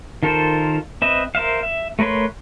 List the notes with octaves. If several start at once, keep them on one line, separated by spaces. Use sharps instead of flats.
D#3 F4 A4 A#4 C5
C4 B4 D#5 E5
A#4 C5 E5 F5
E5
A3 A#4 B4 C#5 C6